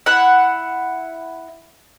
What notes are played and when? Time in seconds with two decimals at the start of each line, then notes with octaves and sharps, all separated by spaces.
0.06 E4 F#5